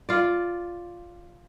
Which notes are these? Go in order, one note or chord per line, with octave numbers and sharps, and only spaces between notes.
F4 D5